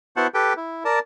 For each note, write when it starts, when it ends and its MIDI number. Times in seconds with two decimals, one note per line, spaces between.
0.16 0.27 59
0.16 0.27 64
0.16 0.27 66
0.16 0.27 72
0.16 0.27 78
0.16 0.27 81
0.34 0.53 67
0.34 0.53 69
0.34 0.53 71
0.34 0.53 79
0.57 0.84 64
0.85 0.99 70
0.85 0.99 74
0.85 0.99 81